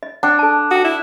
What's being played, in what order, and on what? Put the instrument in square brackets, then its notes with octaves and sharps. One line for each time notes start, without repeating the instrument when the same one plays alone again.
[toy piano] D#5
[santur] D4 [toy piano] F#5 G5
[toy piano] A4 A5
[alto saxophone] F#4 [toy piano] G5 D#6
[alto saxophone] E4